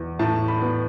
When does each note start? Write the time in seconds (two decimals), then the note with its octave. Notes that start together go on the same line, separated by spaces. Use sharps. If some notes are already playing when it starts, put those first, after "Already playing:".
Already playing: E2
0.19 A2 A5
0.48 B5
0.62 B3